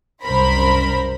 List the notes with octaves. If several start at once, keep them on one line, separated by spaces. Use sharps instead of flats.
C2 F#2 A#4 C5 B5